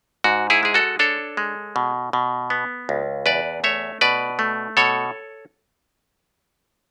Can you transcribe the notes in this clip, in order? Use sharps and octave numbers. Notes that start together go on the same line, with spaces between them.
G#2 F#4
E4 G#4
G#3 G#4
F#4 A4
D4 A4 C#5
G#3
B2
B2
B3
C#2
E2 B4 D5
A3 C#5 E5
B2 B4 D5
A3
B2 A4 C#5